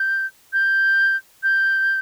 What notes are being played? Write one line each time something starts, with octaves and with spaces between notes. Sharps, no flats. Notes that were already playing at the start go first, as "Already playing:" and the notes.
Already playing: G6
G6
G6